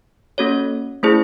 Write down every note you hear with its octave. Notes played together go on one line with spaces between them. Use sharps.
A#3 C#4 F#4 A4 C#5
A3 C#4 E4 G#4 C5